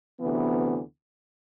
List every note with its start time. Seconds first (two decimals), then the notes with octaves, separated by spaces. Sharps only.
0.20 D2 C3 E3 B3